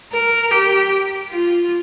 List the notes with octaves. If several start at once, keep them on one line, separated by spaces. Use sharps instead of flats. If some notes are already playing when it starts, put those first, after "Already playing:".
A#4
G4
F4